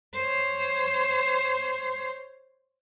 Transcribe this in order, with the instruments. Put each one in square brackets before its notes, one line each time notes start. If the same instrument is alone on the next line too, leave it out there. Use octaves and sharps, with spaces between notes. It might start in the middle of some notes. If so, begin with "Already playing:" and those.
[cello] C5 C#5